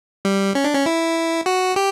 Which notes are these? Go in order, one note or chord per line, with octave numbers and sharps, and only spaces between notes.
G3
C#4
D4
C#4
E4
F#4
G4